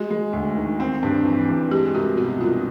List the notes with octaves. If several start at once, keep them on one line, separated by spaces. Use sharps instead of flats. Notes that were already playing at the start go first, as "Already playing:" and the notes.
Already playing: G#3 F#4
G#3
D2
D#3
C4
G2
E3
G2
G#3 G4
C2 F#4
B2 F#4
C2 F4